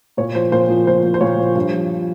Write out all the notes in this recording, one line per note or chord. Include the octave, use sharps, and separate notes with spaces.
A#2 C#5
F3 C5
A#2 C5
F3
A#2 C5
F3
C5
A#2 C#5
F3
G2
F3